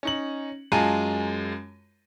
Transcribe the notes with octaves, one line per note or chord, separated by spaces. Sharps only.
C#4 D#4 F#7
F#2 G#3 F4 A5 A#5 D#7